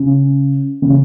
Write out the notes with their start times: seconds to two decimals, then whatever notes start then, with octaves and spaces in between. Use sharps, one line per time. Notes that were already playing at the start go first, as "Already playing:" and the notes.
Already playing: C#3
0.82 C#3